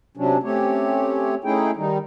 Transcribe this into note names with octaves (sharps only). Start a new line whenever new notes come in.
C3 F#3 C#4 D4
A3 C4 C#4 G4 C#5
A3 C#4 D#4 E4 G#4 G5
D#3 G3 D#4